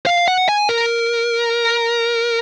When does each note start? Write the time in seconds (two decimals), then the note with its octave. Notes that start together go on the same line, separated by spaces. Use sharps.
0.06 F5
0.28 F#5
0.49 G#5
0.69 A#4